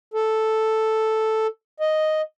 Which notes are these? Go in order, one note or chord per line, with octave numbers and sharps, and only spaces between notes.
A4
D#5